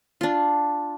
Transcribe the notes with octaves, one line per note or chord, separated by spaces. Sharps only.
D4 F4